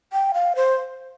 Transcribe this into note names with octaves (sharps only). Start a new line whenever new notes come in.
G5
F5
C5